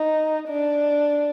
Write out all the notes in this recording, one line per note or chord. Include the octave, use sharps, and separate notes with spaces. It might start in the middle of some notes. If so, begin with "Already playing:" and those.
Already playing: D#4
D4